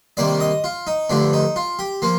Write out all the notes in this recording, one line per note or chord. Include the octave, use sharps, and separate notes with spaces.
C3 D#3 G3 A#3 D5
D#5
F4
D#4
G2 D3 F3 A3 D4
D#4
F4
G4
F3 A#3 F4